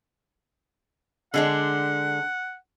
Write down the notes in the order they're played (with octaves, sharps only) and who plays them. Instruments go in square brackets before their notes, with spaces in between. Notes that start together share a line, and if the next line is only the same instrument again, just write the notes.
[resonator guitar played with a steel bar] D3 G#3 D4 [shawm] F#5